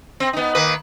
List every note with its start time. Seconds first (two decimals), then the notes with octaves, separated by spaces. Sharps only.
0.20 C4
0.33 B3 D#4
0.55 D#3 A#3 B4